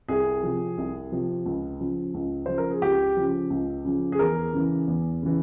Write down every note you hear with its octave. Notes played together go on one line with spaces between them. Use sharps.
C2 G#4
C3 F3
C2
C3 F3
C#2
C#3 F3
C#2
C#3 F3 C5
A#4
G#4
C#2 G4
C#3 F3
C#2
C#3 F3
G#4
E2 A#4
C#3 E3
E2
C#3 E3